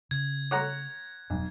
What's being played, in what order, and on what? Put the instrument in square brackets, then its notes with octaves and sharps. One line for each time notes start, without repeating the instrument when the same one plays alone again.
[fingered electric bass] C#3 [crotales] G#6
[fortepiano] C#5 F#5 A#5
[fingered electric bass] E1 [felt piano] B1